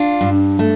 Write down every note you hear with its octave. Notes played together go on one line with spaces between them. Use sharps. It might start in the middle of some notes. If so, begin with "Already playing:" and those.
Already playing: D4 F4
G2
A3